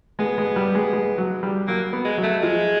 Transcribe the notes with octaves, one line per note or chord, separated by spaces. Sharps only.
G#3 B3
G#3
G3
G#3
G#3
F#3
G3
F#3 A#3
B3
G#3
F#3
A3
F3 G#3